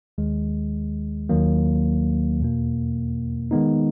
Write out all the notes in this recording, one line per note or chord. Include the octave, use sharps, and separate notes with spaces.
D#2 D#3 G#3
D#2 D#3 F#3 A#3
E2 B2 A#3
D#3 G#3 B3 D#4